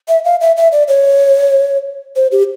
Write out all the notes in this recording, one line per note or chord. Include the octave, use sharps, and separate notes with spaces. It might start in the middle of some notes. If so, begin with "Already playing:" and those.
E5
F5
E5
E5
D5
C#5
C5
G4